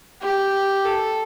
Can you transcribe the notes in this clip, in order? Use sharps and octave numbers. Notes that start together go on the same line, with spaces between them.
G4
A4